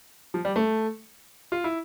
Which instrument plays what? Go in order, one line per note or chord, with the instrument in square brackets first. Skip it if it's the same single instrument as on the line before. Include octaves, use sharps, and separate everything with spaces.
[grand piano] F3
G3
A3
F4
E4